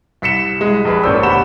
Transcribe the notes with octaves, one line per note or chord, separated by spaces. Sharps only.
C2 B6 C#7 E7
C2 G#3
A#1 G#4 B4
G#1 A#2 C#4 C5 D5 E6
D2 B3 G4 F#5 B5 E7